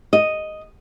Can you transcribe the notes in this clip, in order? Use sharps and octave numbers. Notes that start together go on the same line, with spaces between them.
D#5